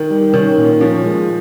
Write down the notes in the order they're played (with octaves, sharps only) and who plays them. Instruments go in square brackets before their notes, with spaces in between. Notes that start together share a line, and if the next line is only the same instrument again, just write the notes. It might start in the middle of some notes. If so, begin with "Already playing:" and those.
Already playing: [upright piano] D#3
[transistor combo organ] G3
[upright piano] D#3 [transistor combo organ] C#4
[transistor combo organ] A#2
[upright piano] F3 [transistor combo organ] C#4
[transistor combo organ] G#3